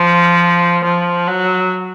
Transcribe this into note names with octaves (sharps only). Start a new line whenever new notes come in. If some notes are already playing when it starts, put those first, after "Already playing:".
Already playing: F3
F3
F#3